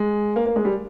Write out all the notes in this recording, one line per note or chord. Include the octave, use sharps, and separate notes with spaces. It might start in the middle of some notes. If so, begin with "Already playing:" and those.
Already playing: G#3
A#3
A#3
G#3
G3